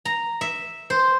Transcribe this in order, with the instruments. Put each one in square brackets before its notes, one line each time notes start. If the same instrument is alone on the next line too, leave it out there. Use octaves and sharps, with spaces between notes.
[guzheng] A#5
E5
C5